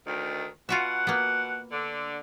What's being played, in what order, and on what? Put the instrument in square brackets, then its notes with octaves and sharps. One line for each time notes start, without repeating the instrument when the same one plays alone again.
[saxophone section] D2 D#3
[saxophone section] B2 F#5 [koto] F4 F#4 E5
[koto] A#3 B3
[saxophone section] D3